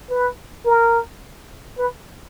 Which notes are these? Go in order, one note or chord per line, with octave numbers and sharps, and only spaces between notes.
B4
A#4
B4